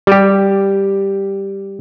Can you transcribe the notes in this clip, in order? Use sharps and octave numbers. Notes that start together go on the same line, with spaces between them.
G3 G4